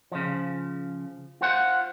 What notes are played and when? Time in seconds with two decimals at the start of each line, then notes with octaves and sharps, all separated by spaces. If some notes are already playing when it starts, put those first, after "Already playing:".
0.12 C#3 F3
1.41 F4 C5 F#5